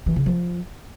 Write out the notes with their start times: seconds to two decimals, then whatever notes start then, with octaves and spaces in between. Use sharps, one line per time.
0.06 E3
0.16 C#3
0.26 F3